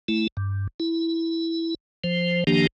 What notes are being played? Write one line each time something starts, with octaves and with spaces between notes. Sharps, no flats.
A3 E4
G2
E4
F3 C5
D#3 F3 A#3 D4 G4